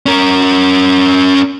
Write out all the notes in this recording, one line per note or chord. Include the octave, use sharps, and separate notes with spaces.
C#4 A#4